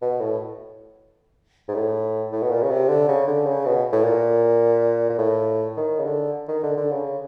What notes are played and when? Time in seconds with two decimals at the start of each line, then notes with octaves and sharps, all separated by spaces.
0.02 B2
0.21 A2
1.69 G#2
1.75 A2
2.32 A2
2.43 B2
2.51 A#2
2.62 C#3
2.70 C3
2.89 D3
3.08 C#3
3.27 D3
3.46 C#3
3.66 B2
3.92 A2
4.04 A#2
5.10 A#2
5.19 A2
5.77 D#3
5.99 C#3
6.05 D3
6.48 D#3
6.63 D3
6.77 D3
6.92 C#3